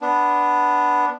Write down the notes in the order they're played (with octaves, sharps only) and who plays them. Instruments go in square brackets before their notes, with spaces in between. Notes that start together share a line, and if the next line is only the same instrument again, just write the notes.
[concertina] B3 D4